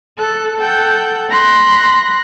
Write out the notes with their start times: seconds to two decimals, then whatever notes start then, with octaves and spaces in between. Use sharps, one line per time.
0.19 A4 F#6
0.58 A4 F#5 G5 G6
1.31 B5 C6 F#6 A#6